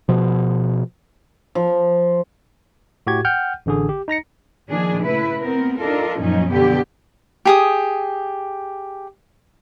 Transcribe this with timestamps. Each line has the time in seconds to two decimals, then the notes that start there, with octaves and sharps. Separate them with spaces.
0.09 B2 F3
1.55 F3
3.07 A2 F#4 G4 G#6
3.25 F#5 G5 F6 G6
3.66 A1 D3 G#4
3.89 G4
4.08 D#4 A#5 A#6 C#7
4.69 A#2 D#3 F3 D4 G#4
5.03 C#3 A3 E4 B4
5.40 B3 C4 A#4
5.78 D4 D#4 F4 A4 A#4
6.18 F#2 A#2 F3 F#3 C#4 D#4
6.50 B2 D3 F3 B3 G4
7.45 G4 G#4 D#6